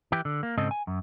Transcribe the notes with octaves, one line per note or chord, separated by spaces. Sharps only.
E3 G4
D3
A#3
G#2 C#3 C4 A4 D#5
G#5
F#2